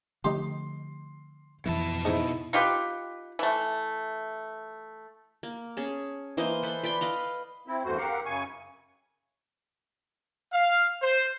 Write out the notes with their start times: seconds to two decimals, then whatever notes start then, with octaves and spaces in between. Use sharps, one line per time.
0.24 D3 F3 A3 D#4 G4 C6
1.66 F2 B2 E3 F3 E4 A5
2.05 G#2 D#4 E4 C#6 D#6
2.53 D#4 F4 G4 B4
3.39 E3 A3
5.43 A#3
5.77 C#4 G#4 A5
6.37 E3 A#3 C5 D#5
6.63 A4 B4 C5
6.83 B4 D5 B5 C6
7.01 B4 D#5 F5
7.67 C4 E4
7.85 E2 G2 A3 F#4 C5
7.97 C4 G4 A#4 F5 F#5
8.26 F#2 C#3 G#5 C#6
10.54 F5
11.03 C5